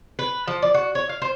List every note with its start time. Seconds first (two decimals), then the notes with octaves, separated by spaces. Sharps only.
0.19 B4
0.47 F3
0.62 D5
0.74 F#4
0.95 C#5
1.09 F5
1.22 C5